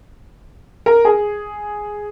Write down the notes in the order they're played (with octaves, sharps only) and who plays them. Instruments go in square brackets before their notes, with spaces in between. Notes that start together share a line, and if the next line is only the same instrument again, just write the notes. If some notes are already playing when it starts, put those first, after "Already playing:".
[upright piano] A#4
G#4